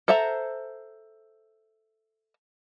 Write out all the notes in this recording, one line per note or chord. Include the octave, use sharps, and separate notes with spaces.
A4 C5 E5 F#5 A#5